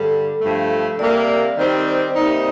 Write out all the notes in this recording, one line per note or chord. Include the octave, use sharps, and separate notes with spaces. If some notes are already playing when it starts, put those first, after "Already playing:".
Already playing: G2 D3 G3 A4
G2 F3 A3
C3 G3 A#3 D5
D#3 G3 C4 D#5
C5
C3 G3 A#3 D#4 D5